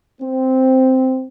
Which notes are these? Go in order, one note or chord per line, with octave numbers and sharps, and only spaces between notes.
C4